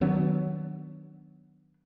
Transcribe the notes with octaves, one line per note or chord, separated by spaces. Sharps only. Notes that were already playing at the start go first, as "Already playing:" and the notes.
D#3 F#3 B3 D4